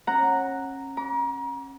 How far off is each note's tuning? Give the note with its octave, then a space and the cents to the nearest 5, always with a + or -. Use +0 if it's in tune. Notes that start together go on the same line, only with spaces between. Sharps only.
C#4 -30 F#5 +0 A#5 -5
A#5 +35 D6 -30